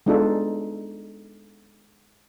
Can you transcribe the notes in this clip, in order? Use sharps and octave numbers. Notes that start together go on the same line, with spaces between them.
G#3 B3 D4 D#4 F4 A4